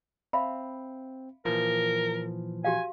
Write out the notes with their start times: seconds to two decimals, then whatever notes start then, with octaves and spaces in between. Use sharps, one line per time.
0.33 C4 E5 F5 B5
1.45 A#2 E3 F3 A#4
2.64 F#4 G4 F5 G#5